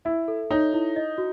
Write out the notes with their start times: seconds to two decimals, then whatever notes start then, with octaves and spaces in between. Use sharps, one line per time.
0.05 E4 E5
0.28 A4
0.51 D#4 C#5
0.73 E4
0.96 D#5
1.18 F#4